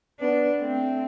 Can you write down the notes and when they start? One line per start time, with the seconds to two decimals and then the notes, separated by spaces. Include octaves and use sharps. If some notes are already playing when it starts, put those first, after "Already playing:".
0.20 B3 D4
0.62 A3 C4